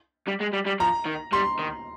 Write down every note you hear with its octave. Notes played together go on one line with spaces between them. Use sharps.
G3
G#3
G3
G3
F3 A#5
D#3
G3 C6
D#3